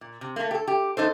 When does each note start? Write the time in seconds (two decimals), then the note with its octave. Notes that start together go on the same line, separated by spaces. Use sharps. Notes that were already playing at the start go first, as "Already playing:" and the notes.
0.01 A#2
0.21 C3
0.36 A3 A#3
0.51 G4 A4
0.67 G4
0.97 E2 D#4 A4 C5